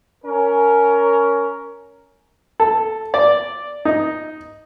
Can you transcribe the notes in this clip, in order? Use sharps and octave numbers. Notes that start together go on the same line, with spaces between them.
C#4 A#4
A4
D5
D#4